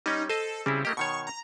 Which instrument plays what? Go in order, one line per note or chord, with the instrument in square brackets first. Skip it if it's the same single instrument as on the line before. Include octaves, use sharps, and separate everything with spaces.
[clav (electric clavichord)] G3 C#4 [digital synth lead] D#4
[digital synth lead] A4 [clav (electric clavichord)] C5 D#5
[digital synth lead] C#3 [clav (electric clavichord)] G3 C4 E4
[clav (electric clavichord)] A3 A#3 G4 [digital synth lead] D#5
[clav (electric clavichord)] B2 D#3 C#5 [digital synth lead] C#6
[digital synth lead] A#5